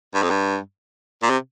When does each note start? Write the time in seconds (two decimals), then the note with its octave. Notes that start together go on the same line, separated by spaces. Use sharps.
0.14 G2
0.23 F2
0.30 G2
1.22 A#2
1.30 C3